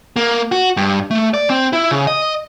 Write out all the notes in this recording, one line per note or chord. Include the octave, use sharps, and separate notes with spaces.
A#3
F#4
G2
A3
D5
C4
E4
C#3
D#5